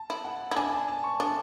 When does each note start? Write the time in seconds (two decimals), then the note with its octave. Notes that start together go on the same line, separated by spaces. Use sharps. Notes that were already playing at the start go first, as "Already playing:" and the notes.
Already playing: A5
0.10 E4
0.25 F#5
0.51 E4
0.56 D4 G#5
0.73 G#5
0.88 A5
1.04 C#6
1.20 D4